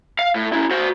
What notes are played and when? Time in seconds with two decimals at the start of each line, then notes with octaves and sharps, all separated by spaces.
0.19 F5
0.35 A2
0.53 C#4 E4
0.71 F#4 C5